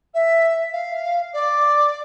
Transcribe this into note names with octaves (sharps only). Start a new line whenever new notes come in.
E5
F5
D5